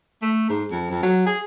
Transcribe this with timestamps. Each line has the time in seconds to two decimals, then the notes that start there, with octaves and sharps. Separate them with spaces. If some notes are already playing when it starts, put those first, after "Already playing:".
0.22 A3
0.49 G#2
0.72 F2
0.90 F2
1.03 F#3
1.27 G#4